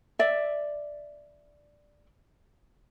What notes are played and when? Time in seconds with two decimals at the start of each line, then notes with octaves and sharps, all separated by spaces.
0.19 D5 E5